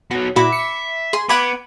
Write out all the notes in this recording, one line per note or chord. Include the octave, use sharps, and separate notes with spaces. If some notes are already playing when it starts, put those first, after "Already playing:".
B2 F#3 F#4
A#2 E4 F#4 E5 B5 D6
C#7
G#4 C6
B3 F#5 B5 D6 G#6 D7